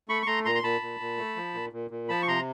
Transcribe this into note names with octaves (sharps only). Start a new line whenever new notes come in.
A3 B5 C#6
C#6
A3 A#5 C6
A#2 A#5 C6
C6
A#2 A5 B5
A#2
A#2
A3
F3
A#2
A#2
A#2
F3 A5 B5
C#6
C3 A#5 C6